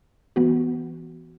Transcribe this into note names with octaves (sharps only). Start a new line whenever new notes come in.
E3 B3 F#4